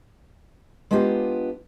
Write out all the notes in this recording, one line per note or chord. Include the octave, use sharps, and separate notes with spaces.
G#3 B3 D4 F4 G4